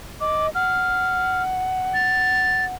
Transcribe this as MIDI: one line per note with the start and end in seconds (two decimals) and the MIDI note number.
0.21 0.49 75
0.21 0.47 86
0.55 2.75 78
0.55 1.43 89
1.94 2.65 93